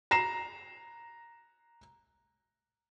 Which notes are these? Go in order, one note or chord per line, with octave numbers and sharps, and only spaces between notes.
A#5 A#6 C7 E7